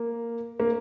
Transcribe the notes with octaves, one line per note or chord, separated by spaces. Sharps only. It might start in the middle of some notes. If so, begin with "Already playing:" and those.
Already playing: A#3
A#3